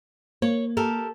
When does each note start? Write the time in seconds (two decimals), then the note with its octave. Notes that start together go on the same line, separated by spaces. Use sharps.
0.42 A#3 C#5
0.77 G4 A4 A#4